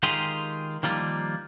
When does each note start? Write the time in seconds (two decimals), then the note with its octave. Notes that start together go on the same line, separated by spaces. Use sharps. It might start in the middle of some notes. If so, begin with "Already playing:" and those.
0.03 D#3 G#3 F4 G4 G#4
0.83 D#3 F3 G3 A#3 D#4 F4